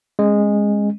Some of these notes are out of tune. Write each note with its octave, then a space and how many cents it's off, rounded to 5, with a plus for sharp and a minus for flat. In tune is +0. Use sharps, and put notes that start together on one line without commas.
G#3 -10 C#4 -30